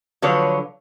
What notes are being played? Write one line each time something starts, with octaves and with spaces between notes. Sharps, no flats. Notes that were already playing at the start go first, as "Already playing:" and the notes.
D3 F3 F#3 B4 C#5